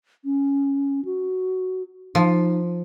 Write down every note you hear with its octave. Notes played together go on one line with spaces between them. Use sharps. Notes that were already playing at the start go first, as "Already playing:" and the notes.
C#4
F#4
F3 D#4